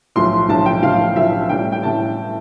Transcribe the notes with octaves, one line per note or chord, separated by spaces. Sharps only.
B1 A2 F3 C6
B1 A2 F3 A5
G5
B1 A2 F3 F5
B1 A2 F3 E5
A1 A2 G3 G5
G5
A2 G3 A5